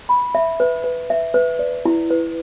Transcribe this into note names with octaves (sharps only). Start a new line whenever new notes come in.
B5
E5
B4
B4
E5
B4
D5
E4
B4